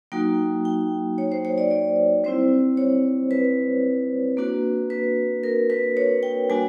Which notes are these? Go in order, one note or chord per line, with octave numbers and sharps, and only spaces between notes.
F#3 A#3 D#4 F#4 G5
G5
C#5
C5
C#5
D5
D5
G3 C4 E4 C5
C#5
B4
A#3 D4 F#4
B4
A#4
B4
C#5
G5
G3 A#3 D4 F#4 G#5